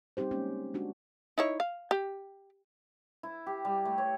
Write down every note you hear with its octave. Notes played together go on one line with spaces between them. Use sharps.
G3 C4 D#4 G4 C5
G#3 A#3 C#4
G#3 D4 F#4
D#4 E4 C#5
F5
G4
E4
G4
G3
A3
C#5